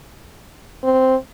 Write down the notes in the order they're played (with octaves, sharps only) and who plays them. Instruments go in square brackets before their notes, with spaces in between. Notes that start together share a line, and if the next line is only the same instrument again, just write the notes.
[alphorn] C4